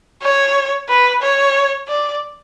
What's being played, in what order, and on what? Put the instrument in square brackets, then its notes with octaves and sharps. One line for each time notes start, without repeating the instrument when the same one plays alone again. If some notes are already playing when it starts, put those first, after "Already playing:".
[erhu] C#5
B4
C#5
D5